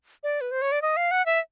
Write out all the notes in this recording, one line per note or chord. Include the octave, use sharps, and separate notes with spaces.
D5
B4
C5
C#5
D5
D#5
F5
F#5
E5